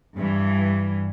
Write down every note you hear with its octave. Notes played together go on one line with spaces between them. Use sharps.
G2 E3